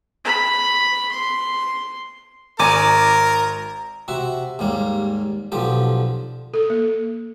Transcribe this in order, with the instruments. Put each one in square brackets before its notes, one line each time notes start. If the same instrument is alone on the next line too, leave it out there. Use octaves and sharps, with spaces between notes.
[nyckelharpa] B5
C6
[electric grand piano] G#1 [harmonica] A#4 [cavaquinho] D5 G#5 D6 [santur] A#5
[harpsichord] C3 F#4 E5
D#2 G#2 G3 A#3
B1 D3 F3 G4
[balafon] A4
A#3